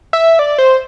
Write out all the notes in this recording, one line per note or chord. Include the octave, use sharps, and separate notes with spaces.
E5
D5
C5